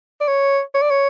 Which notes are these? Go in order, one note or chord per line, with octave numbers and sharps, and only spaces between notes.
D5
C#5
C#5
D5
C#5